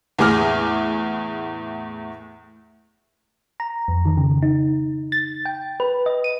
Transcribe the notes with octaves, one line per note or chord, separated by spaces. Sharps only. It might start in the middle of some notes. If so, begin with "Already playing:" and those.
E2 A2 G#4 D6 F6 A#6
A#5
F2
D#3
C#3
D#4
A6
G5
B4
D#5
D#7